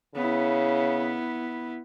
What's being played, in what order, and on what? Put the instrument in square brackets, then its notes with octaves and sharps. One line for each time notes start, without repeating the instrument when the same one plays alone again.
[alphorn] C#3 [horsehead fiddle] B3 E4